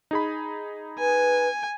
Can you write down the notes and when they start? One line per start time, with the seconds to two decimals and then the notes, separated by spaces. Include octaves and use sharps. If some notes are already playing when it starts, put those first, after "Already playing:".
0.11 D#4 G#4 B5
0.99 B4 G#5